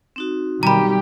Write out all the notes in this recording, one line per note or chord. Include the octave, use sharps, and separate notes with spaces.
C4 D#4 F#4
B1 D#3 G3 G4 A#5 B5